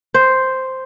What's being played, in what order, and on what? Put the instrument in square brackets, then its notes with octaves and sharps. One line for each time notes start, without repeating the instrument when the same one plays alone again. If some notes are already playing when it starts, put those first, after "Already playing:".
[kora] C5